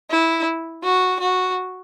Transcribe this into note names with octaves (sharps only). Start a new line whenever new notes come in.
E4
F#4
F#4